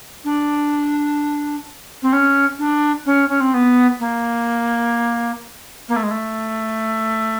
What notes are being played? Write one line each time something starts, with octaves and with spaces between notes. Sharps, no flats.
D4
C4
C#4
D4
C#4
C#4
C4
B3
A#3
A#3
A3
G#3
A3